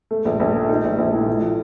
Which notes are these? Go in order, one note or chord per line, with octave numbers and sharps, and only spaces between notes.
A3
A#1
A#1
A3
D#4
A#1
A#1
A2
A2
F3